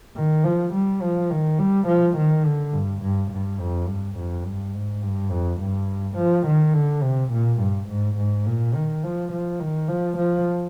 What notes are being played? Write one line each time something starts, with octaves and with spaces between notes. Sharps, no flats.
D#3
F3
G3
F3
D#3
G3
F3
D#3
D3
G2
G2
G2
F2
G2
F2
G2
G#2
G2
F2
G2
F3
D#3
D3
C3
A#2
G2
G#2
G#2
A#2
D#3
F3
F3
D#3
F3
F3